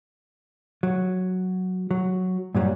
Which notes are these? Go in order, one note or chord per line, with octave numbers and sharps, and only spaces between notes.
F#3
F#3
G2 A#2 F#3 G3